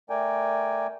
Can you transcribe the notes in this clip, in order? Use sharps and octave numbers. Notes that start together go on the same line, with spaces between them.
A3 A#4 D5 G5 G#5